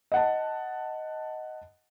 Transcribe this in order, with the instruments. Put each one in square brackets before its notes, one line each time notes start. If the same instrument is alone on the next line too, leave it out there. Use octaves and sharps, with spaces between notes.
[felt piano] D#5 F#5 A5